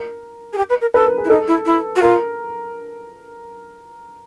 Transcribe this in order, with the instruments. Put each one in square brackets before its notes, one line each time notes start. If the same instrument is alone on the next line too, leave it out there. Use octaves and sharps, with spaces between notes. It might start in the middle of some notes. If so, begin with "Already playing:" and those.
Already playing: [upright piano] A#4
[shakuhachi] G#4
G4
B4
A#4
[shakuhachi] A4 [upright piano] B4
[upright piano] A#4
G#4
[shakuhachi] E4
[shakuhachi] D#4 [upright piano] A4
[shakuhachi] E4
E4
F#4
[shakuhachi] F4 [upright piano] A#4